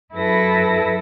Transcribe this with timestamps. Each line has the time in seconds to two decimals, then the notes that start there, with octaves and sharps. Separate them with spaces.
0.15 F#2 E4 A4 B4 A#6